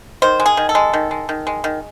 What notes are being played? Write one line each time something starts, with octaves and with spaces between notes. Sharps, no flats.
D#3 C5
G#3
G#4
D#3
A4
G#3
D#3
G#3
D#3
G#3
D#3